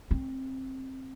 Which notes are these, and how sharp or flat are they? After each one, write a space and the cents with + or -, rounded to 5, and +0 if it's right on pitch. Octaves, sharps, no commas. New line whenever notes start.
C4 +15